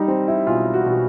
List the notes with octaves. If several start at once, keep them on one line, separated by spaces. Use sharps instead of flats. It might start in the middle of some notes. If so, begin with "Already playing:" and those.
Already playing: G3 D#4
C4
E4
B1 F4
F#4
B2